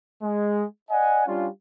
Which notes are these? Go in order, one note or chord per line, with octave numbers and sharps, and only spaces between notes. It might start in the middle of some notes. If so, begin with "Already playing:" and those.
G#3
D5 D#5 F#5 G#5
G3 C#4 D4 F4